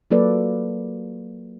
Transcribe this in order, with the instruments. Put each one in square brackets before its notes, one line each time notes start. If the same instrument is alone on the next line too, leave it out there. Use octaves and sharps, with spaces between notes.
[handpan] F#3 A#3 F4 A4 B4 D5